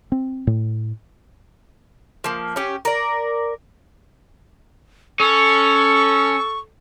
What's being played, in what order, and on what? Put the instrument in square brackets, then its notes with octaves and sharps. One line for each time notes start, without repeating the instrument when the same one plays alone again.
[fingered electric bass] C4
A2
[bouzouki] F3 A#3
C#4 G4
A#4 D5
[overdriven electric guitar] C#4 [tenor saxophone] A4 [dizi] C#6